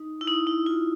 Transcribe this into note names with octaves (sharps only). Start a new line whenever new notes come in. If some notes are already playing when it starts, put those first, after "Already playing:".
Already playing: D#4
E4
D#4
E4
F4